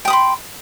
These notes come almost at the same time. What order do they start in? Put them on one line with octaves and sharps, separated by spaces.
G5 D#6 B5 C6